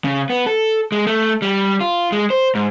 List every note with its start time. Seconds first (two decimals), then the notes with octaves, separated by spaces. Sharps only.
0.04 C#3
0.30 B3
0.47 A4
0.92 G#3
1.07 A3
1.42 G3
1.81 F4
2.12 G#3
2.30 C5
2.55 G#2